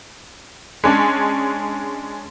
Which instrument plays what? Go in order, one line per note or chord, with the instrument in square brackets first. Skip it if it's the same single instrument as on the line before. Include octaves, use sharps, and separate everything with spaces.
[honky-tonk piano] G#3 C#4 D4